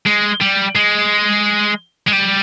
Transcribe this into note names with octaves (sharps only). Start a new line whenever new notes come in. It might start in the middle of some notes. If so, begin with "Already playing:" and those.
G#3
G3
G#3
G#3
G3